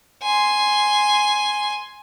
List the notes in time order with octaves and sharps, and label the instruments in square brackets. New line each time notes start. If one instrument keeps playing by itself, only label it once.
[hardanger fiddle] G#5 C6